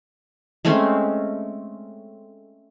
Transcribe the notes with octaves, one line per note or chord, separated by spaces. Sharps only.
G#3 A3 C4 C#4